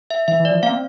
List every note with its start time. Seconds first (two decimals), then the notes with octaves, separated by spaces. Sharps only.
0.11 E5
0.28 E3 E5
0.40 E3
0.45 D5
0.51 F3
0.63 A#3 F5
0.69 C4